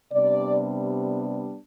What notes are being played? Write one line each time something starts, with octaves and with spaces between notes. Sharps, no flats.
C3 G3 B3 D4 D5